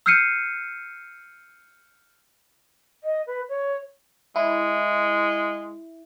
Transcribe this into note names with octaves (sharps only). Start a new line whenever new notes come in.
E6 F6 G6 C7 C#7 D#7
D#5
B4
C#5
G#3 E4